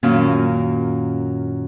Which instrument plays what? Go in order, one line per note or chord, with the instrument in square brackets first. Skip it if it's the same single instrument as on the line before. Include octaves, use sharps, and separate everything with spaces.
[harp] F#2 A#2 D#3 C#4